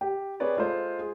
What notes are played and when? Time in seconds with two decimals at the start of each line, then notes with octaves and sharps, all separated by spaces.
0.01 G4
0.40 C4 G#4 B4 C#5 D5
0.57 G#3 F4 A4 C5
0.99 G#4